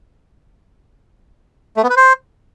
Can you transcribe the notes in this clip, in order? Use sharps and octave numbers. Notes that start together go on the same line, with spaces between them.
A3
B3
B4
C5